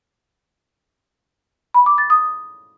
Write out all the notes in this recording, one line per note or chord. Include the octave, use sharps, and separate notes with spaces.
B5
D6
A6
D#6